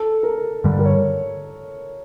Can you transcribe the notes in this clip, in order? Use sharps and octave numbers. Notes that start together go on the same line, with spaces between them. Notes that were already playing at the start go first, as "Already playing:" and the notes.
Already playing: A4
A#4
G2 D3 G3
A#4
C#5